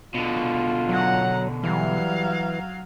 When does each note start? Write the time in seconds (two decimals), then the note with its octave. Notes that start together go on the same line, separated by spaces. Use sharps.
0.15 B2 D3 F4
0.89 F#3 F#5 A#5
1.63 E3 F#3 G3 F5